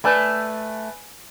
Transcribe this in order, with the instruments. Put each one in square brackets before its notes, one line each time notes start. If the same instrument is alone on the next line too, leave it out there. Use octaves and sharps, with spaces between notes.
[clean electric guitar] A3 [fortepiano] B4 D5 G#5